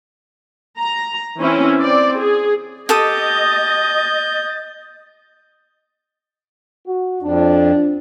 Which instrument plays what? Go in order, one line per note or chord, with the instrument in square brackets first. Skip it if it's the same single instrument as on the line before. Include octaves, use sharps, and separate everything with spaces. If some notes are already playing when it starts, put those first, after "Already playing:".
[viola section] A#5
E3 C4 C#4 E4
C4 D5
G#4
[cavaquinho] G4 A4 D#6 [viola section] D#5 [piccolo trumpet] G6 [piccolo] A6
[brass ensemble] F#4
[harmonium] F2 [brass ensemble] D4